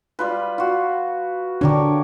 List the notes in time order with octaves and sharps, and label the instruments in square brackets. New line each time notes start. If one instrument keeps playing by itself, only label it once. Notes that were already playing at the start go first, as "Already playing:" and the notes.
[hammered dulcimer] G3 F4 B4
F4 F#4
[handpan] D3 D4 [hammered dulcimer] G4 A#4 C#5